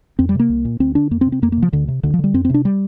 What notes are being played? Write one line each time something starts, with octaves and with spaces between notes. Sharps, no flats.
F2 C4
G3
C3 A#3
C2
A#2
D2 C4
D3 D4
F2 A#3
C4
C3
C4
F2 A#3
A#3
C3
F3
D2 D3
C3
D2 D3
F3
D3 G3
F2 C4
C4
C3 D4
G3